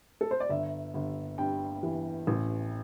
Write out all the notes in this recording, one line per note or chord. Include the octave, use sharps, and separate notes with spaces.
A4
C5
D5
G1 E5
G1
G2 G5
E3
A1